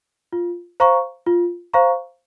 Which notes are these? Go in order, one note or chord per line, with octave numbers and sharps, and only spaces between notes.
F4
C5 F5 A#5 C#6
F4
C5 F5 A#5 C#6